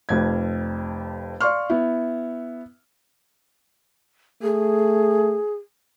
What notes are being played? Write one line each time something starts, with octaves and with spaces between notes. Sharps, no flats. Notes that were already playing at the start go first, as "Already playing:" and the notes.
F1 F2 G#6
D5 F5 C6 C#6 F6
B3 E4
A3 G#4